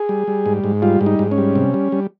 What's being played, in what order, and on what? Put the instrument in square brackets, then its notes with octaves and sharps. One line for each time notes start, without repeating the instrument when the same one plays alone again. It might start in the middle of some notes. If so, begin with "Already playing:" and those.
Already playing: [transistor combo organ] G#4
G3
G3
G#2
G#2
G3 F4
G#2
D#4
G#2
C#4
G3
C3
G3
G3